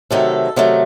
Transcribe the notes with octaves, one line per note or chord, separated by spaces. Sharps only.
C3 D#3 F#3 A3 A4
C3 D#3 F#3 A3